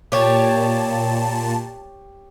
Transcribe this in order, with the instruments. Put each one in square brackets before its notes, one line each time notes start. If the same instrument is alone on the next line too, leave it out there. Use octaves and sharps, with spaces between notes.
[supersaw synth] A#2 A5 [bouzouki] G4 C#5